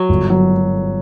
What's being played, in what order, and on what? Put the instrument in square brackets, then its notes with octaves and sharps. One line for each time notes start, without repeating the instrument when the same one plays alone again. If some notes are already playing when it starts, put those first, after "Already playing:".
Already playing: [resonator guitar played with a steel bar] F#3
[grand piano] G1
F#3